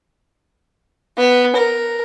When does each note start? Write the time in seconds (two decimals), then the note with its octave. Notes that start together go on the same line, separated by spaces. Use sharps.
1.18 B3
1.56 A#4